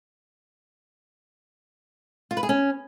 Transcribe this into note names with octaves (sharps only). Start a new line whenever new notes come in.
F4
B4
G#4
C#4